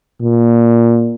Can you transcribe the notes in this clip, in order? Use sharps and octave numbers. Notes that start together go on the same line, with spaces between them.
A#2